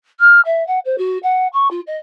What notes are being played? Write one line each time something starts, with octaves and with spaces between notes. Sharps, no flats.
F6
E5
F#5
C5
F#4
F#5
C#6
F4
D#5